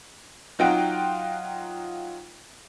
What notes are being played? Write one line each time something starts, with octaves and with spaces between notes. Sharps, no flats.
F#3 D#4 F4 F#5 G5 D7